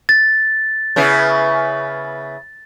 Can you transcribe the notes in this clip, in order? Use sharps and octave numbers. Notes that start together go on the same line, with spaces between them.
A6
C#3 B3 E4